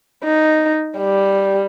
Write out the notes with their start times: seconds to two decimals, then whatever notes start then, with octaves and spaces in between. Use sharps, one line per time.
0.24 D#4
0.98 G3